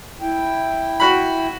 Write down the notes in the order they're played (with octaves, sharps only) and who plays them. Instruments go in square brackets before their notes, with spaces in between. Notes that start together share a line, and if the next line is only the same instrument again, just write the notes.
[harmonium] E4 G5
[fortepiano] F#4 B5